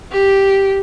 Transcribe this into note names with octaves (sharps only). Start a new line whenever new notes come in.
G4